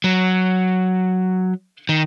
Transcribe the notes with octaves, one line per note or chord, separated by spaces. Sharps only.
F#3
D#3